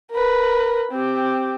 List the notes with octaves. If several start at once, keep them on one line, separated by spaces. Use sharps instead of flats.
A#4 B4
C4 G4